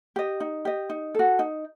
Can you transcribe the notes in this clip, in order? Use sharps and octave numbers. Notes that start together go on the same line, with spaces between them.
G4 D#5
D#4
G4 D#5
D#4
F#4 A4
D#4